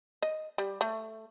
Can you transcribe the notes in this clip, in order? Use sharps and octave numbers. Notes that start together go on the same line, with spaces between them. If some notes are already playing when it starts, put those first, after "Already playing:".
D#5
G3
A3